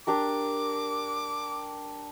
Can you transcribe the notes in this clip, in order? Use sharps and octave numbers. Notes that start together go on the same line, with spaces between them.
D4 G4 A#4 D6